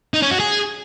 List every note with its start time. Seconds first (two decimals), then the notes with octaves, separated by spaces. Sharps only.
0.14 D#4
0.22 C#4
0.31 F#4
0.40 G#4